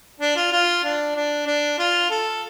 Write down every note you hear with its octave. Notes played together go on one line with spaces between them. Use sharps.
D4
F4
F4
D4
D4
D4
F4
A4